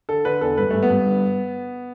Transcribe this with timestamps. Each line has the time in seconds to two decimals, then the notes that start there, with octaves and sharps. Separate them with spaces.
0.09 D3 A4
0.25 D3 B4
0.41 E2 A4
0.57 G2 B4
0.70 G2 A3
0.82 B3
0.90 G2
1.06 D3